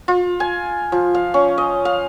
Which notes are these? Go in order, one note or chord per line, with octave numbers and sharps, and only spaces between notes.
F4
G#5
F3
F5
C#4
D#5
F5